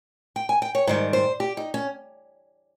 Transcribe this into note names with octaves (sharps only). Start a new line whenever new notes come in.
G5
G#5
G5
C#5
G#2 D#3 G3 C5
C5
G4
D#4
C#4